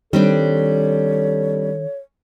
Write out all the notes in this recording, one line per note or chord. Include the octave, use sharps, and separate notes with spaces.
D#3 G3 C4 D4 A4 C#5